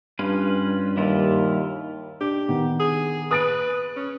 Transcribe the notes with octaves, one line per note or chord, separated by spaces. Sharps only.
G2 C#4 F4 B4
D#2 G3 E4 F4
D4 G4
D#3 B3
G#4
B4 D#6 A6 D7
C#4